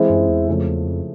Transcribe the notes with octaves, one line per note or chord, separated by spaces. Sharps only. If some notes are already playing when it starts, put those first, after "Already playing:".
Already playing: E3 G#3 C4 E4
F#2
E2
F2 C#3 F3 A3
E2
F2